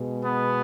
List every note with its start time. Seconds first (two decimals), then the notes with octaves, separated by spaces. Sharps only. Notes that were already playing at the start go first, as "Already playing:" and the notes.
Already playing: B2 G#3
0.23 B3